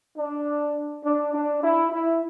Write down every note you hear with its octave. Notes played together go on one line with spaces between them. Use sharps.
D4
D4
D4
E4
E4